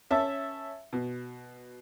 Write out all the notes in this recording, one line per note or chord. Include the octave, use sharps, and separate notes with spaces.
C#4 E5 A5
B2